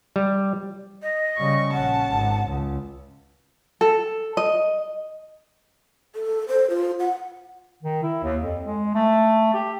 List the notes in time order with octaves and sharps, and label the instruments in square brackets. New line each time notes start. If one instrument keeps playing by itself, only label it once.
[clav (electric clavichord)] G3
[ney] D#5
[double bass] C#3 G3 [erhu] C#6
[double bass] A#1 C#4 [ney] F#5 [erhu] A5
[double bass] G#1
C#2
[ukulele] A4
D#5
[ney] A4
C5
F4
F#5
[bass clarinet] D#3
E4
D#2
F2
G#3
A3
G4